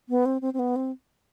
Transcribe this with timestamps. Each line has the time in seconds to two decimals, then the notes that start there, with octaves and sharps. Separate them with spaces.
0.09 B3
0.26 C4
0.42 C4
0.54 C4
0.59 B3
0.76 C4